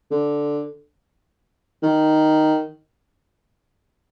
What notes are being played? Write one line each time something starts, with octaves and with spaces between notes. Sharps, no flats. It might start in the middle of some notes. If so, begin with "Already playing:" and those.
D3
D#3